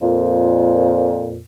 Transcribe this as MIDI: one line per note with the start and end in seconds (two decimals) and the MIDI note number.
0.02 1.41 41
0.02 1.41 46